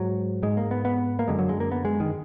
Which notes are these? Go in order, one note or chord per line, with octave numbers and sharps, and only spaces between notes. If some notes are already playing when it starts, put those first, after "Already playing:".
Already playing: G#2 F#3
G#2 G#3
A#3
B3
B3
A#3
F#2 D3 G#3
F#3
G#3
A#3
B3
G#3
D#3